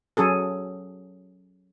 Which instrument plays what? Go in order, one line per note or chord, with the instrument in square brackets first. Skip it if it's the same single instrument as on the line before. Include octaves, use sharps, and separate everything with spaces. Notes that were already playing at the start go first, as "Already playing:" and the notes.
[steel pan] F#3 C#4 G#4 A4